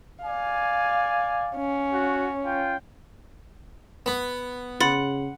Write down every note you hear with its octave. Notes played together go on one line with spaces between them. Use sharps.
D5 F5 G#5
C#4
F#4
F4 G5
B3
C#3 F#5 B5 C6 A6